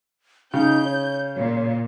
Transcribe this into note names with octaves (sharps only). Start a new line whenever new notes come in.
C#3 D#4 G6
C#5
A#2